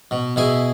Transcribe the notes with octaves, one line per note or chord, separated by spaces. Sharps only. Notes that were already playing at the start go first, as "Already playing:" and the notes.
B2
B2 E4 G#4